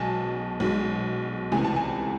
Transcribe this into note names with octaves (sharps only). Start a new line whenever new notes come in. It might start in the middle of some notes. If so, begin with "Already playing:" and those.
Already playing: B1 B2 G#3 G#5 A5
B1 B2 G#3
C#2 C3 E3 A3 G#5
A5
G#5